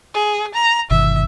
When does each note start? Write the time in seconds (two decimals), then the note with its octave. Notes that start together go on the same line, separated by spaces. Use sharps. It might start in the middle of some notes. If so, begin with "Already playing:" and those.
0.14 G#4
0.54 A#5
0.91 G1 B2 D#3 E5